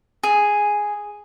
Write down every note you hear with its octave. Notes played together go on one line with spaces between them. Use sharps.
G#4